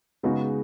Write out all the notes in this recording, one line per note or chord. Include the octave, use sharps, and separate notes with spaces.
C#3 G#3 B3 D#4 F#4